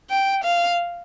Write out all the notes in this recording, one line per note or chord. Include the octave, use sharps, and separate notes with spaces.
G5
F5